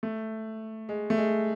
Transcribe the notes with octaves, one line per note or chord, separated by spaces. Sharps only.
A3
G#3
A3
G#3